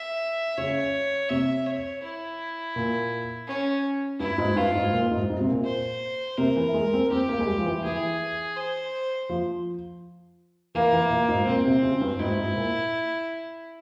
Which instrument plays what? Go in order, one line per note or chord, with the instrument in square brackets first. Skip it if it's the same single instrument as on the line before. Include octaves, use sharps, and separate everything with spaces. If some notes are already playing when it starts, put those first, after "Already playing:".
Already playing: [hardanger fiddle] E5
[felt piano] C#3 [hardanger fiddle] C#5
[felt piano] C3 [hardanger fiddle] E5
[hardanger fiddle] C#5
E4
[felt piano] A#2
[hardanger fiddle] C#4
[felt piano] G2 [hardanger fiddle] E4
[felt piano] G#2
[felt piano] G2 [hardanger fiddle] F4
[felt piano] G#2
A#2
G#2
G#2
C3
A#2
[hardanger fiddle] C5
[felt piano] C3 [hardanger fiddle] A#4
[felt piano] E3
G#3
C4
[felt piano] C4 [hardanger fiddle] G4
[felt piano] A#3
G#3
G3
F3
E3
[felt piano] E3 [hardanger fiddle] G#4
[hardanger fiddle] C5
[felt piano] F3
[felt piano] E3 [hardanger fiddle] A#3
[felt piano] E3
A#2
G#2
[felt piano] A#2 [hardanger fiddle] C4
[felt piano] C3
C#3
G2
[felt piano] G#2 [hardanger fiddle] E4
[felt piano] G#2
A#2